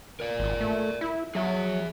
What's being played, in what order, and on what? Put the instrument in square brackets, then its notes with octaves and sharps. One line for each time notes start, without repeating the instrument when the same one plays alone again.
[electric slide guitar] A#4 D5
[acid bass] G#1
A3
E4
[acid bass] F#3 [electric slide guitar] G#4 E5